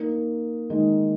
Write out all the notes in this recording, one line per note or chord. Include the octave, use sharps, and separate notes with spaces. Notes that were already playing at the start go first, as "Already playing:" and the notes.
Already playing: A#3 D#4
D#3 G#3